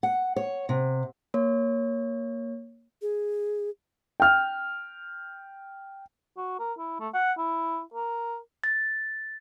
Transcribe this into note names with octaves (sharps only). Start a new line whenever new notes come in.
F#5
C#5
C3
A#3 C#5
G#4
G5 F6
F#4
A#4
E4
A3
F#5
E4
A#4
A6